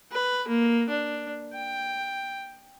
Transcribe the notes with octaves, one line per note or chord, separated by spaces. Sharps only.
B4
A#3
D4
G5